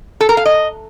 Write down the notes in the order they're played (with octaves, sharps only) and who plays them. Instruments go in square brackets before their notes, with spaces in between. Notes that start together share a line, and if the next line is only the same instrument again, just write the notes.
[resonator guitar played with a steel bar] A4
A#4
F5
D#5